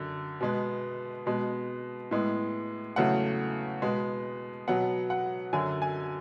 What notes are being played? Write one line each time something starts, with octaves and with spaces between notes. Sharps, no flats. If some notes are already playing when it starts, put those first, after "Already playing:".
Already playing: F#2 D3
B2 G#3 B3
B2 G#3 B3
A2 G#3 B3
E2 C#3 F#3 A3 F#5
B2 G#3 B3
B2 F#3 B3 F#5
F#5
F#2 D3 F#3 G#5
G#5